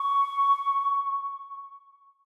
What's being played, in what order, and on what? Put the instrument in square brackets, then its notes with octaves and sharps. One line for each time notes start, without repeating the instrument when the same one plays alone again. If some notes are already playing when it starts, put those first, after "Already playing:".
Already playing: [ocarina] C#6